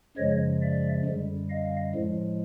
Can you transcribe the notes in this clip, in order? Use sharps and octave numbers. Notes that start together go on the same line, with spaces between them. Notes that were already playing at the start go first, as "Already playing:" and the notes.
F#2 C#3 F3 G#3 C#5 D#5
D5 E5
F#2 D3 G3
D#5 F5
A2 F3 G#3